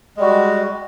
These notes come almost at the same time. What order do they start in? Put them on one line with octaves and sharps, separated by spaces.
G#3 G3 F#4